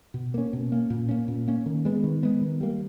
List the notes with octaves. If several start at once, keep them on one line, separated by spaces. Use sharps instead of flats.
B2
A#3 C#4
B2
A#3 C#4
A#2
A#3 C#4
A#2
A#3 C#4
D#3
G#3 B3
D#3
G#3 B3
D#3
G3 A#3